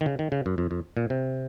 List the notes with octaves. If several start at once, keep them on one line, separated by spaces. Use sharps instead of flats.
D#3
C#3
D#3
C#3
F#2
F2
F2
A#2
C3